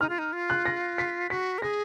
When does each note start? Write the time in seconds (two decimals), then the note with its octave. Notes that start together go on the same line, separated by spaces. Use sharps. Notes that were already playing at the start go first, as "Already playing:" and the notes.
0.01 D#4 F6
0.09 F4
0.19 D#4
0.33 F4
0.50 F#6
0.66 A#6
0.98 B6
1.30 F#4 B6
1.58 A#4
1.62 G#4 A#6